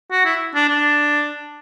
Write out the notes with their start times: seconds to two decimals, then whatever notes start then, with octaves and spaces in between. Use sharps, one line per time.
0.11 F#4
0.25 E4
0.55 D4
0.69 D4